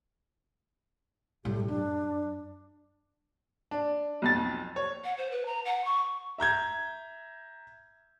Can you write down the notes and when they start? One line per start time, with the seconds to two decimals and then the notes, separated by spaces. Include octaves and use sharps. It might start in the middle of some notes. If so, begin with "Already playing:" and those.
1.45 A2 G3 G4
1.68 F#2 D4
3.71 D4
4.22 B1 F2 A6
4.76 C#5
5.04 F#5
5.18 C5
5.31 B4
5.46 A#5
5.65 F#5
5.84 C#6
6.38 E5 A#5 G6 G#6